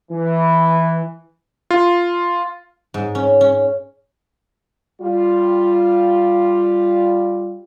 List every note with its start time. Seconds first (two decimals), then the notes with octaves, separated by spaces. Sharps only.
0.11 E3
1.71 F4
2.94 G#2
3.15 C#4
3.41 C#4
5.01 G3 F4